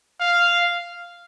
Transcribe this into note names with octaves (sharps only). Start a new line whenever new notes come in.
F5